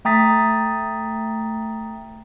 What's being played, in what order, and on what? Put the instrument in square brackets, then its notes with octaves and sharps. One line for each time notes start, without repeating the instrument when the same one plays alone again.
[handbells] A3 G5 A#5 D#6 A6 B6